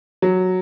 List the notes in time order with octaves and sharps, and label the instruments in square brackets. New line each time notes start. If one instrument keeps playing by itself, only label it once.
[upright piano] F#3